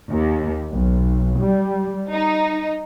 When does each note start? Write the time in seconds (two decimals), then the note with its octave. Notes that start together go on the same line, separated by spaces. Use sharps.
0.11 D#2
0.71 B1
1.38 G3
2.11 D#4